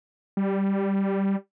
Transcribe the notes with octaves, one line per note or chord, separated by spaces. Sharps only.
G3